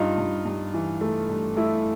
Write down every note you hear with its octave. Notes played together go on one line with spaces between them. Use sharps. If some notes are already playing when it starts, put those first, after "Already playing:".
Already playing: G2 D#4 F4
G2
G2
E3
A3
G2
A3 E4